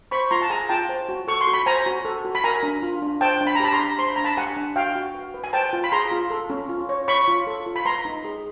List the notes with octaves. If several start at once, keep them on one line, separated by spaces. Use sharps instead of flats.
C5 B5 C#6
F4 A#5 C6
A5
G#4 G#5 A#5
F4 G5 A5
C5
F#4
A4 C#6
C6
F#4
B5
C5 G#5 A#5
F#4
A4
F#4
B5
A#4 G#5 A#5
D4
F4
D4
C5 G5 A5
D4
B5
A#5
G4 A5 B5
A#5 C6
D4
C5 C6
B5
D4 A#5
A5 B5
G4 F#5 G#5
D4
F#4 F5 G5
F#4
B4
B4
G#5
C5 G5 A5
F4
B5
G#4 A#5 C6
F4
A4
C#4
F4
C#5
C#5 B5 C#6
F4
A4
F4
B5
B4 A#5 C6
D#4
G#4